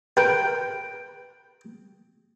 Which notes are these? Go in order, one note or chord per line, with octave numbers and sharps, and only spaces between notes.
A#4 B4 G5